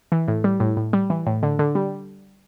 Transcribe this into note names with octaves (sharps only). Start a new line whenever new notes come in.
E3
A2
G3
A2
A2
G3
E3
A2
D3
D3
G3